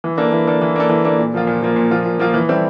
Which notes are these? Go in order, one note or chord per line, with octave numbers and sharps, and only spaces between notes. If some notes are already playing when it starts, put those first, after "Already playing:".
E3
A#3 D4 A4
E3
A#3 D4 A4
E3
A#3 D4 A4
E3
A#3 D4 A4
A#2
F3 A#3 F4
A#2
F3 A#3 F4
A#2
F3 A#3 F4
A#2
F3 A#3 F4
E3
G3 C4 E4 A4